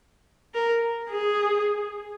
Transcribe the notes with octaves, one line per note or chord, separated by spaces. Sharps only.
A#4
G#4